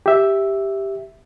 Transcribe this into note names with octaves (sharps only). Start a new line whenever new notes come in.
G4 E5